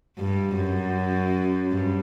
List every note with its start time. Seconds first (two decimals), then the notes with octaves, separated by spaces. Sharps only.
0.18 G2
0.56 F#2
1.72 G2